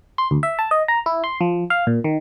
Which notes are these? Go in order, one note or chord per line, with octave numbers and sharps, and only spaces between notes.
C6
D2
E5
A5
D#5
A#5
E4
C6
F3
F5
A#2
D#3